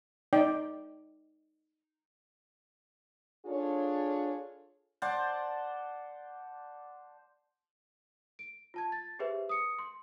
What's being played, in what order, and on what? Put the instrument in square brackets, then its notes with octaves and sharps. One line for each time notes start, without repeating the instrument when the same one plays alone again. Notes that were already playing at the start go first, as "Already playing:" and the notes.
[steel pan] D#4 D5 G5
[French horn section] D4 F4 G#4 A4 C#5
[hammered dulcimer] C5 D5 F#5 A5
[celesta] D7
F4 A5 G#6
A6
G4 G#4 B4 C5 E5
D#6 C#7
C6